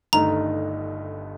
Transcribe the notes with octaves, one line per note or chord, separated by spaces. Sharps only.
G1 G2 D#3 A3 D#4 A#5